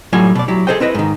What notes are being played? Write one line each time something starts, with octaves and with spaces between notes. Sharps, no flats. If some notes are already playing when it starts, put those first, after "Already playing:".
A2 F#3 G3 F4 G#5
B2 D5
F#3 E4 G4
G#4 A4 C5 D#5 G5
C4 E4 B4 D#5
G#2 D#3